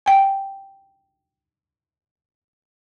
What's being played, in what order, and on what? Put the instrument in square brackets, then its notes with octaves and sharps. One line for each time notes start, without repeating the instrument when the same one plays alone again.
[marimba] G5 G#5